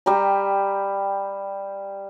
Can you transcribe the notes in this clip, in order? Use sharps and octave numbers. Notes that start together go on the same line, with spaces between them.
G3 G5 A#5